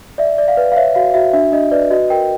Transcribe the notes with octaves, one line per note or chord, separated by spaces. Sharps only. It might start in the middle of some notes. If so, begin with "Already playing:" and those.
D5 E5
D5
F5
B4
F5
C#5 E5
F#4 F5
F#4 E5
D4 E5
D4 D#5
B4 D5
F#4 D#5
A#4 G5